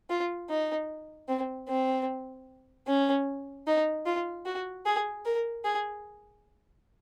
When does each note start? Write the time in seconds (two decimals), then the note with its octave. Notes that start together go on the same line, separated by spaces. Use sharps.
0.10 F4
0.49 D#4
1.28 C4
1.68 C4
2.87 C#4
3.67 D#4
4.06 F4
4.45 F#4
4.86 G#4
5.25 A#4
5.64 G#4